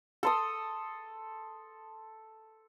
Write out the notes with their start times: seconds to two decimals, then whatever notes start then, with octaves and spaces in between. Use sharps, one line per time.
0.23 A4 C6 D#6